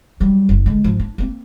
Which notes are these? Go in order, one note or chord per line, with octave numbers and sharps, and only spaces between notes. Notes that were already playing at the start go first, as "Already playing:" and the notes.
F#3 G3
F#1
D3 G#3
G#2 F3
D4
A#3 C4